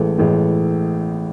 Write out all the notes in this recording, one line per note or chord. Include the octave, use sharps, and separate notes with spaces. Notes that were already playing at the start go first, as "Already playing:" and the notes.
Already playing: A1 A2 G#3 A4
A1 A2 G#3